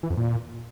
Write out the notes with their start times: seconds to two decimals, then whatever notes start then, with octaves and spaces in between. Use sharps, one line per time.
0.03 E3
0.10 F2
0.17 A#2